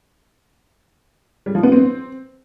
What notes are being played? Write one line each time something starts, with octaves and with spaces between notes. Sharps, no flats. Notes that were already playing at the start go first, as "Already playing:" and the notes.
G3
F3
B3
C4